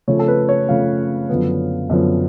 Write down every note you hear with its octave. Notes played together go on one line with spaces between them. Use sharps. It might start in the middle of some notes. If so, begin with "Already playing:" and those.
C#3 F3 A3 C#5
A4
B4
C#5
C#3 F3 A3 F5
F#2 D3 F3 B3
F#2 D3 F3 B3